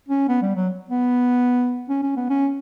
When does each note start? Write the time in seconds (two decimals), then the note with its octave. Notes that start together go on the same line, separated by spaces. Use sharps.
0.09 C#4
0.28 B3
0.42 G3
0.56 F#3
0.89 B3
1.89 C#4
2.03 C#4
2.16 B3
2.30 C#4